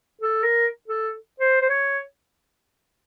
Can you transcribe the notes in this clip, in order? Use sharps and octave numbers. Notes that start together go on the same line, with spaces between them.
A4
A#4
A4
C5
C5
C#5